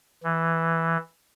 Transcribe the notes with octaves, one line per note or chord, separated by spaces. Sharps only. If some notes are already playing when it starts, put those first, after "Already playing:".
E3